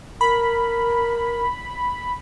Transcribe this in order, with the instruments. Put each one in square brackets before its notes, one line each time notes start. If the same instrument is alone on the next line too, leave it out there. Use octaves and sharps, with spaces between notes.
[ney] A#4 [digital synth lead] B5